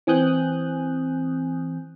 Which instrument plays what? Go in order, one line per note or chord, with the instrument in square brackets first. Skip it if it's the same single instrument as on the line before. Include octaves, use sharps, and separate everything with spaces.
[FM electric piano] E3 C4 G#5 D#6 F#6 G6